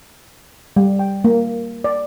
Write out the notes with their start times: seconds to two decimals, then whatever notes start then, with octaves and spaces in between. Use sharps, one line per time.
0.76 G3
0.99 G5
1.24 A#3
1.84 D5